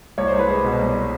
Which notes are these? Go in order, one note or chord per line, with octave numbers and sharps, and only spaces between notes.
C2 C#5
C5
C2
B4
G#3 C5
B2
C2